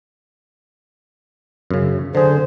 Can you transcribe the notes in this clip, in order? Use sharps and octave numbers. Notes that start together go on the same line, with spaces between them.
F#2 C#3
D3 G#4 C5